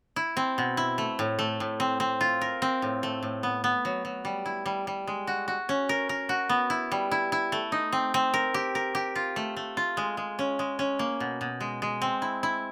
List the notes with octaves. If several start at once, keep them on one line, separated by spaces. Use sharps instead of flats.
E4
C4
B2
E4
A3
A2
A3
A2
C4
C4
F4
A#4
C4
A2
A3
A2
B3
B3
F#3
F#3
G3
E4
G3
G3
G#3
F#4
F#4
C#4
A#4
A#4
F#4
B3
E4
G3
E4
E4
A3
D#4
C4
C4
A#4
G4
A#4
G4
F4
A3
A3
F4
G#3
G#3
C#4
G#3
C#4
A#3
B2
B2
G#3
G#3
C4
E4
E4